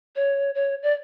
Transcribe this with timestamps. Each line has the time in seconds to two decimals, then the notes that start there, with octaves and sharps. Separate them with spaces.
0.16 C#5
0.55 C#5
0.83 D5